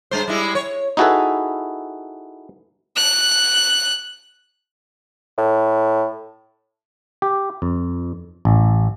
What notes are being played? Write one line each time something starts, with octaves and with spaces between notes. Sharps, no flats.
G2 G#3 C5
G3 G#3 E4
C#5
D#4 E4 F#4 G#4 A4 B4
F#6
A2
G4
F2
A1